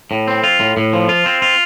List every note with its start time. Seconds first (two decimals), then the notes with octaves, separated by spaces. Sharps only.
0.11 A2
0.28 C4
0.44 F4
0.60 A2
0.77 A2
0.93 F3
1.09 F4
1.26 C4
1.42 F4